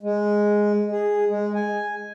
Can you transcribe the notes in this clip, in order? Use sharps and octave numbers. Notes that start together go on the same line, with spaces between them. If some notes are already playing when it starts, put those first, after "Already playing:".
G#3
G#4
G#3
G#5